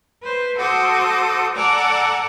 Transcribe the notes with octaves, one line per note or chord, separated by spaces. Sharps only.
B4 C5
F#4 A4 C5 D6 D#6
A4 D5 F#5 G#5 A#5